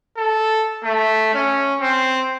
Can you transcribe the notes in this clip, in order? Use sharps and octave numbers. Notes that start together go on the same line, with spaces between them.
A4
A3
C#4
C4